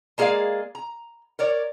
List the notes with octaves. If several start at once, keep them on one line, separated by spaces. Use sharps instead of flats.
G#3 A#3 G#4 C5 D5 F5
A#5
A#4 C#5 D5